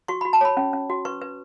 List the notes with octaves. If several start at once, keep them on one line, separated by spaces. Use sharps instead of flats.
F#4 C#6
F#4 B5
A5
C#5 B5
C#4
C#4
F#4
B4 C#6
B4